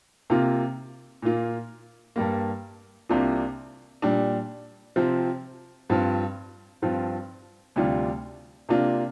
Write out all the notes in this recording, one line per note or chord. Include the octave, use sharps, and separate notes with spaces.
C3 A#3 F4
A#2 A#3 F4
G2 G3 A#3
C2 C3 A#3 D4 F4
A#2 G3 D4
C3 F3 C4
G2 F3 C4 F4
G2 F3 C4 F4
D2 C3 G3 D4 F4
C3 A#3 D4 F4